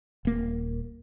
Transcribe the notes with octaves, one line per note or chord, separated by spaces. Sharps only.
D#1 A#3